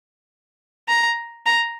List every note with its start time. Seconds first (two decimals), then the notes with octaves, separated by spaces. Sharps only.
0.88 A#5
1.46 A#5